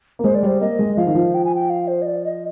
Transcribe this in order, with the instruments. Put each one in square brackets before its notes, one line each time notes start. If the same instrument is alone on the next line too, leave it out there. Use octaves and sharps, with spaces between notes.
[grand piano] A#3
[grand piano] G#3 [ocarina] C5
[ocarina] D5
[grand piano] G3 [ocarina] C5
[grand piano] A#3 [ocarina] D#5
[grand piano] G#3
[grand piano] F3 [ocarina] F5
[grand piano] D#3
F3
[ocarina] G5
G#5
G5
F5
C5
D#5
D5
D#5